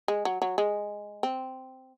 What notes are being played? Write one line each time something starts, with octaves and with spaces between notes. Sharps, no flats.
G#3
F#3
F#3
G#3
C4